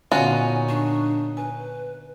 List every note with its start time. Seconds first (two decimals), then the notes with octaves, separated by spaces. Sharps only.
0.12 A#2 D3 B3 C#4 D#4 F4 F#4 G#5
0.69 D4 C#6
1.37 B4 G#5